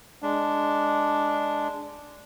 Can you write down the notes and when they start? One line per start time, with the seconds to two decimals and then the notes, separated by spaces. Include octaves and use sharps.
0.22 G#3 D4